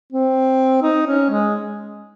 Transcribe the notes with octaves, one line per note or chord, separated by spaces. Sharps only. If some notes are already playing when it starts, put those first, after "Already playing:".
C4
D#4
C#4
G#3